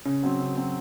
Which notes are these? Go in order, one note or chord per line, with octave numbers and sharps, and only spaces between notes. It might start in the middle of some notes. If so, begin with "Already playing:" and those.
C#3 C#4
F#3 C4
C#3
F#3 C4